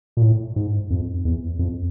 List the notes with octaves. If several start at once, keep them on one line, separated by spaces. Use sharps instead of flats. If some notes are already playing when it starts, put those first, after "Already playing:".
A#2
A2
G#2
F2
E2
F2